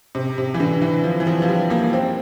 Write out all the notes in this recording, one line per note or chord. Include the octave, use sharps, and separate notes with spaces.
C3
C3
E3
D3
E3
F3
E3
F3
F3
G3
A#3
C4